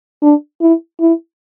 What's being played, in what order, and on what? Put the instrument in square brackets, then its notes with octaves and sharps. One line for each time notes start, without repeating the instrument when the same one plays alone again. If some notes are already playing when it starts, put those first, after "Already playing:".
[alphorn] D4
E4
E4